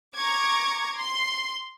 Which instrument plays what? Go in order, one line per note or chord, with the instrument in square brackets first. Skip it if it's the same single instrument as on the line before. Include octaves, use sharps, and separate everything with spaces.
[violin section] A#5 C#6 D6 G#6
C6